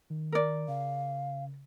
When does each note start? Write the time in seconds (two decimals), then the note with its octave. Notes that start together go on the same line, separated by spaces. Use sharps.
0.10 D#3
0.32 A#4 D5
0.68 C#3 F5